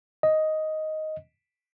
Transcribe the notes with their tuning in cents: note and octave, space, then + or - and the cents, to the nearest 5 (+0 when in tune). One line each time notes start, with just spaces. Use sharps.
D#5 +5